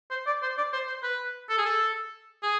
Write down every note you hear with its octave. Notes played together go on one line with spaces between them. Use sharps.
C5
D5
C5
D5
C5
C5
B4
A4
G#4
A4
G#4